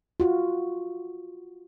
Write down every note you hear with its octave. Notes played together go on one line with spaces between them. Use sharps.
F4 F#4